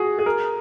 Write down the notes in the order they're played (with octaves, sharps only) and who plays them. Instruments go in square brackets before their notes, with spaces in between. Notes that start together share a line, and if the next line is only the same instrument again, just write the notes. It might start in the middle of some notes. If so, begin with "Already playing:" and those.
Already playing: [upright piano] F#4 G#4
G#4
A#4